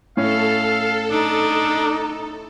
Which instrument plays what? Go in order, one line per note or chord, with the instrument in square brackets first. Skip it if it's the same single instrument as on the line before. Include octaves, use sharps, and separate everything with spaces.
[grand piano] A2 C#4 [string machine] A4 [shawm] F5
[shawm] D4 [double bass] D#4